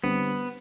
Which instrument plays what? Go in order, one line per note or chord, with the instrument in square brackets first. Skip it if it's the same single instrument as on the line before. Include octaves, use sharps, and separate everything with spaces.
[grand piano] D3 G3 C4 [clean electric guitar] B3